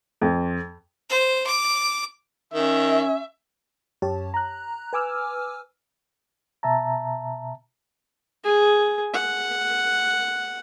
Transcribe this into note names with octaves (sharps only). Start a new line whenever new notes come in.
F2
C5
D6
D#3 C#4 E5
F#2 G4 C#5 A5
A#5 F#6
B4 G#5 D6 E6 F6
B2 E5 A5 A#5
G#4
F#5